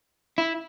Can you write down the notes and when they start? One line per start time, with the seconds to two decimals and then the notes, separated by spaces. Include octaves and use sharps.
0.38 E4